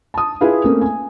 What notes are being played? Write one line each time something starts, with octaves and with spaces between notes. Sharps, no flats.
A5 D#6
E4 F4 G#4 B4 F5
A3 A#3 C4 C#4
G#5